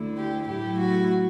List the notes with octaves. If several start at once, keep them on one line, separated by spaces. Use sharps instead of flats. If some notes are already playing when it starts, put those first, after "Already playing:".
Already playing: D2 D3 A3 E4
G4
A2 F#3 A3 E4 G4
F#4